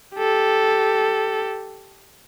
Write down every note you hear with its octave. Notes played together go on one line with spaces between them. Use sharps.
G4 A4